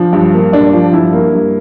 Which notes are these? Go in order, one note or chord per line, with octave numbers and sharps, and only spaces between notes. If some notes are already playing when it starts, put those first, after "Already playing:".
Already playing: F3 D4
G2
A#3
G2 D4
F3
G2 E4
A#3
G2